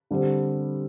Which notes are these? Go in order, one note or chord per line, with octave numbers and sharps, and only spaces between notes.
D3 G3 C4